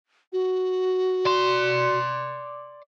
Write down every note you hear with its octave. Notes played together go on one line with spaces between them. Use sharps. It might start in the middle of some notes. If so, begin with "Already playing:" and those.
F#4
D5 C6